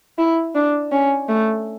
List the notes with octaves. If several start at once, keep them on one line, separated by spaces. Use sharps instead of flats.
E4
D4
C#4
A3